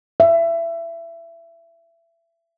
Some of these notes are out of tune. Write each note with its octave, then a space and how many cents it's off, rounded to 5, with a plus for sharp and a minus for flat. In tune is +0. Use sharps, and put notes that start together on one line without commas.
E5 +25